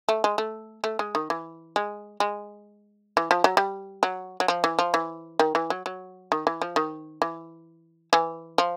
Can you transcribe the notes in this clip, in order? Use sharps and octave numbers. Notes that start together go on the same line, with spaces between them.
A3
G#3
A3
A3
G#3
D#3
E3
G#3
G#3
E3
F3
F#3
G3
F#3
F#3
F3
E3
F3
E3
D#3
E3
F#3
F#3
D#3
E3
F3
D#3
E3
E3
F3